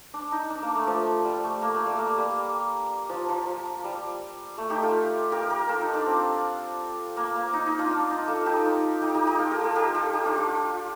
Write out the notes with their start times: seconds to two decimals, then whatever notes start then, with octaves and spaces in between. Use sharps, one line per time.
0.14 D4
0.32 D#4
0.50 D4
0.62 A#3
0.75 A3
0.87 F3
1.25 G3
1.44 A3
1.62 A#3
1.74 A3
1.86 G3
1.99 A#3
2.18 G3
3.09 F3
3.29 F3
3.84 G3
4.58 A3
4.70 D#4 G4
4.82 F4 A4
5.32 G4 A#4
5.50 G4 A#4
5.69 F4 A4
5.81 D#4
5.94 D4
6.06 C4
7.17 A#3
7.35 A#3
7.53 D#4
7.66 D#4
7.79 D4 F4
7.91 D4
8.10 D#4
8.28 F4 A4
8.46 D#4 G4
8.65 D#4
9.02 D#4 G4
9.14 D#4 G4
9.27 D#4 G4
9.39 F4 A4
9.51 G4 A#4
9.64 F4 A4
9.76 G4 A#4
9.95 F4 A4
10.13 D#4 G4
10.25 D4 F4
10.38 D4 F4